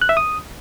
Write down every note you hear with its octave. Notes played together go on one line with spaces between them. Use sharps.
F#6
E5
D#6